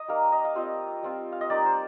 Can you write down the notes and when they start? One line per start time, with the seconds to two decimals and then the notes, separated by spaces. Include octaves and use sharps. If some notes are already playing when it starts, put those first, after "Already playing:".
Already playing: D#5
0.08 G3 A#3 D#4 F5
0.32 D#5
0.45 F5
0.55 G3 C4 F4 D#5
1.03 G3 C4 F4
1.32 F5
1.41 D#5
1.50 G3 A#3 D#4 D5
1.66 C5